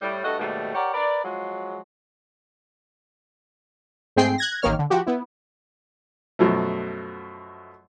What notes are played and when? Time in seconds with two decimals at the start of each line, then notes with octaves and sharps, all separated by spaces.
0.02 A2 G3
0.24 G2 A3 F#4 A4 D#5
0.39 D#2 G#2 B2 G3 A3
0.75 G4 A#4 C#5 D5 F#5
0.94 A#4 B4 D5
1.24 F3 F#3 G#3
4.16 G#2 A3 C4 G#4 G5 C7
4.38 F#6 G#6 A#6
4.62 A1 D#3 A#3 C#5 F6
4.79 D3
4.90 F3 F#4 G4
5.07 B3 E4
6.39 F#2 B2 F3 A3